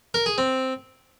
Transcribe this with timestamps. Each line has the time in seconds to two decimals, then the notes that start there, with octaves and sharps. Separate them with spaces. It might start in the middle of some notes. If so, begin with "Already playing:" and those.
0.14 A#4
0.26 G#4
0.38 C4